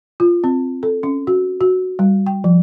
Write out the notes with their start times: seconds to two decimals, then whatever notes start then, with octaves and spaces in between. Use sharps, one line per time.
0.20 F4
0.44 C4
0.83 A4
1.03 C#4
1.27 F#4
1.61 F#4
1.99 G3
2.27 G5
2.44 F3